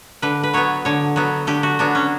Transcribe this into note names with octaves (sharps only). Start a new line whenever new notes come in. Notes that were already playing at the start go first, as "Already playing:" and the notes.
D3 B4
B4
F#3 B3 C#5
D3 C#5
F#3 B3
D3 G4
F#4
F#3 B3 D4
C#4